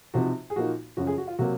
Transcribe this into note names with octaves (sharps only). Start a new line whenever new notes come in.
C3 F3 C4 D#4 F#4
G#4
A#2 F3 A#3 D#4 F#4
F#2 C#3 F3 F#4
G#4
F#4
F4
C3 F#3 A#3 F#4